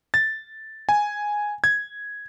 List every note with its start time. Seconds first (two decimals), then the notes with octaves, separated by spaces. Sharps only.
0.14 A6
0.89 G#5
1.64 G#6